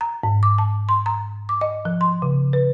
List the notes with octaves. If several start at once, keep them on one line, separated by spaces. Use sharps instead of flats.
A#5
G#2
D6
A5
C6
A#5
D6
D#5
F3
C6
C#3
B4